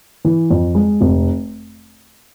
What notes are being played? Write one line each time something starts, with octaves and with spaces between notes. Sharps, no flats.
E3
F2
G#3
F1